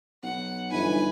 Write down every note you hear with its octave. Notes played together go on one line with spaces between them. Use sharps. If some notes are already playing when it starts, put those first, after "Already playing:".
B1 F#5
G1 E3 D#4 B4 G#5